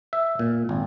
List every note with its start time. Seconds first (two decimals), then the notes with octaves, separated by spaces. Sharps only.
0.13 E5
0.39 A#2
0.69 G#1